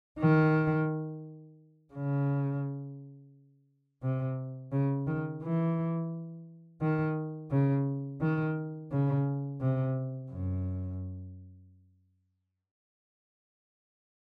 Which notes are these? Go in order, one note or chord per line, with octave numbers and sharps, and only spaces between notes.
D#3
C#3
C3
C#3
D#3
E3
D#3
C#3
D#3
C#3
C3
F#2